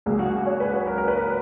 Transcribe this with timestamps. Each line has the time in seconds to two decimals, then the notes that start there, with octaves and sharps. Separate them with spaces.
0.06 C#2 C#3 F#3 A#3 G#4
0.19 F#4
0.46 C#5
0.60 B4
0.74 B4
0.87 A#4
0.98 A#4
1.08 B4
1.17 A#4